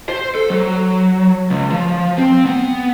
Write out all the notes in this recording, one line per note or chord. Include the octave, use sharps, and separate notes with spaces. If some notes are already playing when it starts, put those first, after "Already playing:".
C5
A4
F#3
C#2
F3
C4
B3